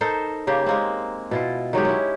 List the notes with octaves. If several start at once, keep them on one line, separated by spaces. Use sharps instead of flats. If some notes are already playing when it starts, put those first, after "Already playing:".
D#4 A4 A#4 C5
C#3 A#3 G4
G#3 A#3 C4
B2 E4 F4
D#3 F#3 G#3 G4
C#4 E4